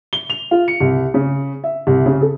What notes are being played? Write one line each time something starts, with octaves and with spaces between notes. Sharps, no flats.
G7
F7
F4
C#7
C2
C#3
E5
C2
C#3
A4